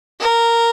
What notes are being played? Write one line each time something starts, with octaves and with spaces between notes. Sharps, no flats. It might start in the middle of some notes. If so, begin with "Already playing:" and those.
A#4